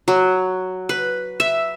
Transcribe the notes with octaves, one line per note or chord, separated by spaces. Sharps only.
F#3
B4
E5